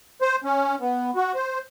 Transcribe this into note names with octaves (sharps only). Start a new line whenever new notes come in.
C5
C#4
B3
F#4
C5